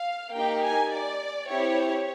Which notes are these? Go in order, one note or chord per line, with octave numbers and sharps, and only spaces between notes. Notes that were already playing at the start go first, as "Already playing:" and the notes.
Already playing: F5
A#3 D#4 G4 G5
G#5
D5
C4 E4 G4 C#5